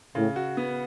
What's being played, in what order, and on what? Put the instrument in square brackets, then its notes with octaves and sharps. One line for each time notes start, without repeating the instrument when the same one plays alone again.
[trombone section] A2 [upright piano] C#3
[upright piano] F#4
B3